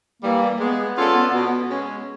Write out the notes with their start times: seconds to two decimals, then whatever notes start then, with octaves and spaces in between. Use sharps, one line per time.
0.22 E3 G3 A#3
0.59 G#3 B3
0.95 C#4 F4 A4 D5
1.33 B2
1.69 G#3 C#4